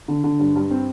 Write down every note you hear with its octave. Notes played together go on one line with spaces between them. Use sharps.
D3
D3
G2
G2
C4